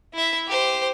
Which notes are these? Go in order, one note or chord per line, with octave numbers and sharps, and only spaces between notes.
E4 E5
G4 C5